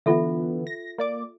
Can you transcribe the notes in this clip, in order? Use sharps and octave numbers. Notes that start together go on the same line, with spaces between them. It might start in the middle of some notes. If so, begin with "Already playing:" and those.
D3 E3 B3 F4 A4 E5
A#6
A#3 D5 D6